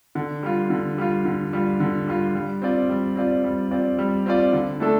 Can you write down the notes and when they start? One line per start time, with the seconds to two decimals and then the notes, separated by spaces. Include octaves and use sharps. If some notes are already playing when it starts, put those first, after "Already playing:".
0.15 D3
0.43 G3 F4
0.70 D3
0.98 G3 F4
1.25 D3
1.53 G3 F4
1.80 D3
2.08 G3 F4
2.35 G3
2.62 C4 F4 D5
2.89 G3
3.16 C4 F4 D5
3.44 G3
3.71 C4 F4 D5
3.99 G3
4.26 C4 F4 D5
4.53 D3
4.80 A3 D4 A4